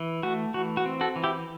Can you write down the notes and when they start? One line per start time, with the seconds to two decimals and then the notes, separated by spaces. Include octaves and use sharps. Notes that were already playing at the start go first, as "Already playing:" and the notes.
Already playing: E3
0.23 A3 F#4
0.54 E3 F#4
0.77 F#4
0.85 C4
1.01 F#4 A4
1.16 E3
1.24 E4 G4